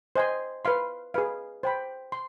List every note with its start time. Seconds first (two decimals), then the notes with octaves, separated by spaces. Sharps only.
0.16 C5 D#5 G#5 C6
0.65 B4 F5 C6
1.14 G#4 B4 F5
1.63 C5 G5 B5
2.12 C6